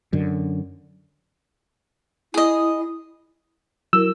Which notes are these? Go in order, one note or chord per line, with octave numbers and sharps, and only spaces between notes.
F#2 D3
E4 G#4 D#5
F#3 E4 A#4 E6